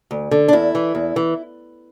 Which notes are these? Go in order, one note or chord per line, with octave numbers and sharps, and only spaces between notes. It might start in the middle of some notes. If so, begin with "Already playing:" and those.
D2
D3
D4
E2 E4
E3
E2
E3